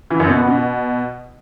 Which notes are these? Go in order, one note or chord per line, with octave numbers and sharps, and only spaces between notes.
E3
F#2
B2
B3
B2